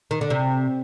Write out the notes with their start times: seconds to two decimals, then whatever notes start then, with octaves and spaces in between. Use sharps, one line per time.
0.11 D#3
0.21 D3
0.30 C3